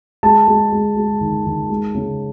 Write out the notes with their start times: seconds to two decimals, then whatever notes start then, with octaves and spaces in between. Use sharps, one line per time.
0.23 G#3 A5
0.48 G#3
0.72 G#3
0.97 G#3
1.21 D#3
1.46 D#3
1.70 G#3
1.95 C#3